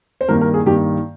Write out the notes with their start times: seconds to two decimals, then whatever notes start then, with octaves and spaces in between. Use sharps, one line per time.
0.21 C5
0.28 G2 D#3 A#3 A#4
0.41 A#4
0.54 G#4
0.66 G2 D#3 A#3 G4